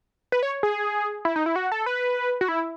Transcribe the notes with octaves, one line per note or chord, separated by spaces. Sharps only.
B4
C#5
G#4
E4
D#4
E4
F#4
A4
B4
F#4
E4